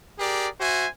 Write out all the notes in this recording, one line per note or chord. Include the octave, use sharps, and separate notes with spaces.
G4 G#4 A#4 D5
F#4 C5 E5 G#5